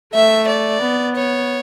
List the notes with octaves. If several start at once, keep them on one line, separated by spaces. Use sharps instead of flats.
A3 E5
D5
B3
C#5